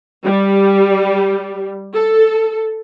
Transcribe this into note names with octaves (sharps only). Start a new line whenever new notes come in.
G3
A4